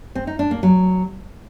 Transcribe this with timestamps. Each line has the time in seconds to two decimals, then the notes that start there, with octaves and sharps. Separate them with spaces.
0.15 C4
0.27 D#4
0.39 D4
0.51 A#3
0.63 F#3